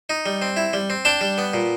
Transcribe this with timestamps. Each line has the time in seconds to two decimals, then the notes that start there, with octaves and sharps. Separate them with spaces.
0.10 D#4
0.26 G3
0.42 C4
0.57 E4
0.73 G3
0.90 C4
1.05 D4 G5 A5
1.21 G3
1.38 B3
1.54 A#2